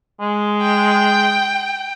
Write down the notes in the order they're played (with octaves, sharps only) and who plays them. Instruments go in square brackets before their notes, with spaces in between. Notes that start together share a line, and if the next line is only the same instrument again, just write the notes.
[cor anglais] G#3
[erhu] G5